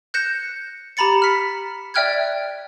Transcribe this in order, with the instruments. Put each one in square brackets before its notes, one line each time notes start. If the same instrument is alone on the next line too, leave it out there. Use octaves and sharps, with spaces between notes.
[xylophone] F#6 G6 A#6 C#7 E7
G4 A#5 B5 A6 C#7
F6 B6
D5 E5 G5 F6 F#6 G#6